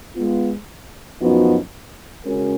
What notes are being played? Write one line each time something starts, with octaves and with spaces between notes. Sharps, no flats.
G#3 B3 F4
F#2 F3 B3 D#4 F#4
C#3 G#3 C#4 F#4 A#4